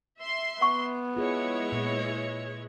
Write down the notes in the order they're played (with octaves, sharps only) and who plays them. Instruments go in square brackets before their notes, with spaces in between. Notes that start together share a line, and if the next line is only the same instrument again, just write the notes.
[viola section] E5 C6
[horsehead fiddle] B3 [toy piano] F#5 C#6
[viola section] G#3 E4 C#5 [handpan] F4 G#4
[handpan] A#2 B4